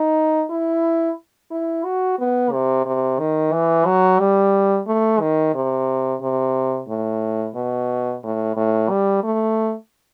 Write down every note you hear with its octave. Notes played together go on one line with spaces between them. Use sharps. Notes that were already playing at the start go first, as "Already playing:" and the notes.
Already playing: D#4
E4
E4
F#4
B3
C3
C3
D#3
E3
F#3
G3
A3
D#3
C3
C3
A2
B2
A2
A2
G3
A3